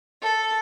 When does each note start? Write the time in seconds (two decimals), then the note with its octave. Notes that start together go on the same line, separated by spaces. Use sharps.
0.21 A4